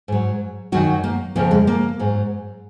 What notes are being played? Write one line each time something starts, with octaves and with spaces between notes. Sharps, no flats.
G#2 F#3
F#2 D#3 F#3 F#4
A#3
F2 C#3 F3 A#3
G#3
A#3
G#2 F#3